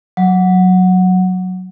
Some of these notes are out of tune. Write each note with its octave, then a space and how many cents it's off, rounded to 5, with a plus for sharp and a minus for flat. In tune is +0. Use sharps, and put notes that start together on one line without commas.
F#3 -5